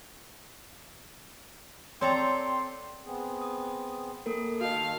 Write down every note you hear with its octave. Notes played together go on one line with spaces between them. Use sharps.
C4 A4 C#5 D5 G5 A#5 C6
B3 C4 G#4
D#6
A#3 A4 A#4
D#3 F#4 A4 D#5 F5